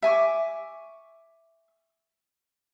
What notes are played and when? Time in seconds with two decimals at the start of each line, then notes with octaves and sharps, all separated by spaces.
0.02 E5 G#5 C#6 D6